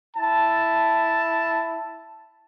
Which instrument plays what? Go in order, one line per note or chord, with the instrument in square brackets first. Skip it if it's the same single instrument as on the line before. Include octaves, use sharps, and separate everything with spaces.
[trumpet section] E4 A5